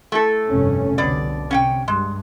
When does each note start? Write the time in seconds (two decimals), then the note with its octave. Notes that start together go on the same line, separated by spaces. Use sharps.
0.12 A3 E4 A4
0.48 F1 G2 C#4
0.98 C2 B2 D3 D5
1.51 C3 C#4 F#5 G5
1.88 G2 G#3